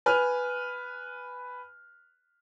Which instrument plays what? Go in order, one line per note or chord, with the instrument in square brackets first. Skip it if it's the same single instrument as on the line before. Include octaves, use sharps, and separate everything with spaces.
[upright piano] B4 G#5 F6